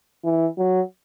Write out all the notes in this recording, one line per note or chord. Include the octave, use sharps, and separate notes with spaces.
E3
F#3